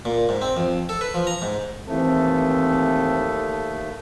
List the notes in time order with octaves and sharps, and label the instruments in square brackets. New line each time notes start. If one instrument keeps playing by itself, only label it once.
[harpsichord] A#2
G#2
C4
F2
A4
B4
F3
A#5
G#2
[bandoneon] D#2 A3 [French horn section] E3 C4 [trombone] A4